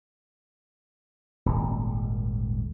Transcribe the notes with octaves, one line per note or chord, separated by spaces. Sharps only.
D#1 G#1